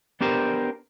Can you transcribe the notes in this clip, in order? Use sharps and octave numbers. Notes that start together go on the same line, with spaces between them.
B3 D4 G4 A#4 C5